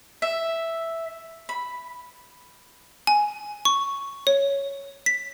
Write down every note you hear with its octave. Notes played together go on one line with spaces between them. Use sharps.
E5
B5
G#5
C#6
C#5
B6